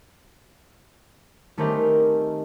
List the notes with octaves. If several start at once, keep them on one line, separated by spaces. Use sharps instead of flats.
D#3 A3 C4 C#4 G4 A#4